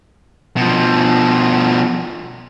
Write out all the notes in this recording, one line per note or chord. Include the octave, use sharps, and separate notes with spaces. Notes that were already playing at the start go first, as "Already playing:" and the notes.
B2 F3